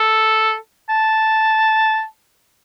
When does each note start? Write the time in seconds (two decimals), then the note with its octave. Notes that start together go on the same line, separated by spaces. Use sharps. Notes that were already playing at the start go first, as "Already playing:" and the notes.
Already playing: A4
0.89 A5